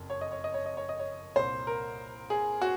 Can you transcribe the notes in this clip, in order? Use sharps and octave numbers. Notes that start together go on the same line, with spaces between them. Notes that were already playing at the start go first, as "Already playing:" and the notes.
Already playing: F#1 F2
C#5
D#5
C#5
D#5
C#5
D#5
C#5
D#5
C#5
C2 A#2 C5
A#4
G#4
F#4